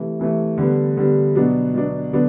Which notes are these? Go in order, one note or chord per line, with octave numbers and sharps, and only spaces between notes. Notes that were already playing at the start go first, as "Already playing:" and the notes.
Already playing: C3 E3 A3
C3 E3 A3
D3 G3 B3
D3 G3 B3
B2 F#3 B3 D4
B2 F#3 B3 D4
D3 F#3 B3 D4